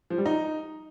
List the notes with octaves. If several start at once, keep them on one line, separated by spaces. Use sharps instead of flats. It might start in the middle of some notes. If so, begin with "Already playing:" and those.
F3
G3
D#4